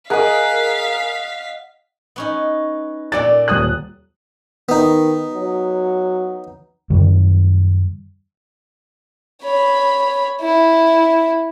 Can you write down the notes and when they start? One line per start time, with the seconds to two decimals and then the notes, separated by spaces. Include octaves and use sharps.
0.10 G#4 A#4 D#5 F5 F#5 B6
2.16 B3 C#4 D#4
3.12 A#2 A#3 A4 D5 A6
3.48 D#1 D#6 F#6
4.69 D#3 B3 D#4
5.33 F#3
6.90 F#2 D#3 G3
9.43 C#5 B5
10.41 E4